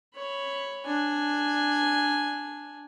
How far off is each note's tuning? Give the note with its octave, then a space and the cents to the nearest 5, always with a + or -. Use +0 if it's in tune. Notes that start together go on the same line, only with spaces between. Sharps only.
C#5 +0 B5 +0
D4 +0 G#5 +0